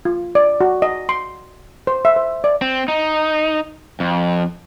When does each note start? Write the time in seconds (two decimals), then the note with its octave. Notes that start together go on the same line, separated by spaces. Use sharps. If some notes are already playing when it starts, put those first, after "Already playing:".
0.05 F4
0.35 D5
0.61 F#4
0.82 D#5
1.09 C6
1.87 C5
2.05 E5
2.16 C5
2.44 D5
2.61 C4
2.88 D#4
4.00 F2